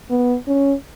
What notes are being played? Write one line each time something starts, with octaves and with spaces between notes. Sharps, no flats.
B3
C#4